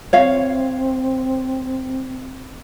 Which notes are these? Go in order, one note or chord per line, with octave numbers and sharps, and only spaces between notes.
C4 C#5 F5